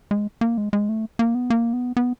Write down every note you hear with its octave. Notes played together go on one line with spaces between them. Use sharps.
G#3
A#3
G#3
G#3
A3
A#3
B3
A#3
B3
B3